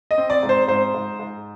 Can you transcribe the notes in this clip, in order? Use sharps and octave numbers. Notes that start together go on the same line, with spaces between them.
D#5
C4
D5
G#2
C5
G#2 C5
G#2
G#2